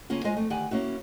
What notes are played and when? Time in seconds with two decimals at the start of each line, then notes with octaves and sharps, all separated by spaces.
0.10 C#3 A#3 C#4 F4
0.24 G#3 F4 C5 D#5 G#5
0.37 F2 A3
0.50 D2 D#3 G4 D5 F#5 G#5
0.71 A#3 C#4 E4 F#4